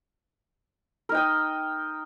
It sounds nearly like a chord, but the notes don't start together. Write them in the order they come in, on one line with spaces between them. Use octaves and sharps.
A#4 D#4 G5 D#5